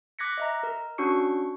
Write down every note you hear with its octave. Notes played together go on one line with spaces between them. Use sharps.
D6 F#6 G#6 A#6 B6 C#7
D#5 E5 A#5
A#4
C#4 D4 F#4 C#6 C#7